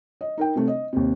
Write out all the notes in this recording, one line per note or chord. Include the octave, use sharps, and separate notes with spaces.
D#5
D#4 A#4 G5
C3 A3
D#5
D#2 C3